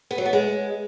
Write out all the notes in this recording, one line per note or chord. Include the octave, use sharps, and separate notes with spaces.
B3
F#3
B3
G#3